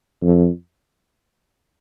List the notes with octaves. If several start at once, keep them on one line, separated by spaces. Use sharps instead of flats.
F2